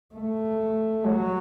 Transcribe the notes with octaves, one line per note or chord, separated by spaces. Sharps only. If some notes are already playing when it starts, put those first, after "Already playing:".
A3
F#3